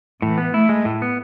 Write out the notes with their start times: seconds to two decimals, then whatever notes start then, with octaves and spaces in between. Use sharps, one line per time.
0.22 A2 E3
0.38 B3
0.53 A3 E4
0.69 G#3
0.85 A2
1.02 B3